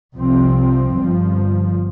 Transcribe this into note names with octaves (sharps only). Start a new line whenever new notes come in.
C2 C3 F3 C4
G1 G2 F3